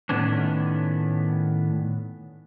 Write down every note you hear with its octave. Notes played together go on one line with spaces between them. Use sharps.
A2 D#3 B3 C#4 D4